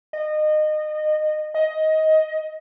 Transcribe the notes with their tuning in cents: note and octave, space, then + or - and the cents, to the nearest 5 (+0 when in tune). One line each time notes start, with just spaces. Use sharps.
D#5 -25
D#5 +15